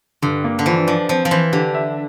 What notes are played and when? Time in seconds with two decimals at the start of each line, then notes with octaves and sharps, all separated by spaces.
0.22 G2 D3
0.44 A#3
0.59 D3
0.66 E3 F3
0.88 F3 D4
1.09 F3 C4
1.25 F3
1.31 E3 C5
1.52 D3 G4
1.74 E5